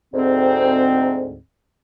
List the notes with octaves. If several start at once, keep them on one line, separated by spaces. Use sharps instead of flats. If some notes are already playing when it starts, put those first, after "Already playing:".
D2 G#2 C4